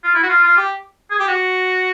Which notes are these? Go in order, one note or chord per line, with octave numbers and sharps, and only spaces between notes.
F4
E4
F#4
F4
F4
G4
G#4
G4
F#4